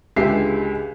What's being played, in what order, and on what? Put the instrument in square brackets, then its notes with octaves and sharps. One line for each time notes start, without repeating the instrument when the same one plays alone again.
[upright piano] C#2 D3 G#3 G4 E5 C7